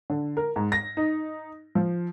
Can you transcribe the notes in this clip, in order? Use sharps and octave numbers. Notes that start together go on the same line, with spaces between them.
D3
A#4
G#2
A#6
D#4
F3